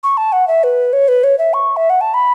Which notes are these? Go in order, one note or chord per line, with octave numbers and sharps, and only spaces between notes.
C#6
A5
F#5
E5
B4
C#5
B4
C#5
E5
C#6
E5
F#5
A5
B5